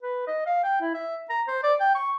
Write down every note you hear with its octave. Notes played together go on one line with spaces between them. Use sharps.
B4
D#5
F5
G5
E4
E5
A#5
C5
D5
G5
C#6